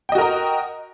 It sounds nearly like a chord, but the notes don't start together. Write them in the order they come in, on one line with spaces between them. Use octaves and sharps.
G5 D#5 F#4 A#4 A#5